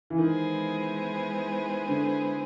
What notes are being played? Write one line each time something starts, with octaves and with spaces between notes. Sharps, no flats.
E3
D#3 G#3 B3 E4 G#4 C5
D3